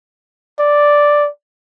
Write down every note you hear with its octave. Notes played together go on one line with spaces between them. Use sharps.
D5